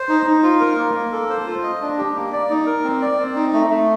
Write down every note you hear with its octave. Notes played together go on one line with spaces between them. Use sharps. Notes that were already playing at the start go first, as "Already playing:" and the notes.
Already playing: C5
D#4
D#4
F4
A#4
A#3
A#3
A4
C5
F4
D#5
D4
G4
A#3
D5
D#4
A#4
C4
D5
C4
D#4
A3
A3